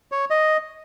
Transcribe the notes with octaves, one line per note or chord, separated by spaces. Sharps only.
C#5
D#5